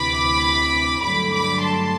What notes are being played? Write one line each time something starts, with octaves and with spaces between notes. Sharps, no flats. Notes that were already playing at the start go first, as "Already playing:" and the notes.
Already playing: D2 C3 E3 B5 D6
G2 D3 F#3 A3 B5 D6
B5 D6
A5 C6